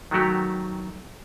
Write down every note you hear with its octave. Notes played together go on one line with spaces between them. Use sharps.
D#3 F#3 A3 F#4 G4